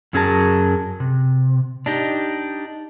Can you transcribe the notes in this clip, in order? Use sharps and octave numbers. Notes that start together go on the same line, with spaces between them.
F#2 F#3 C#4 G#4 A#4 A5
C3
D4 D#4 G4